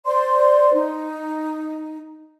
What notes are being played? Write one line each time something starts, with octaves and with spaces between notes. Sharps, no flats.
C5 D5 C6
D#4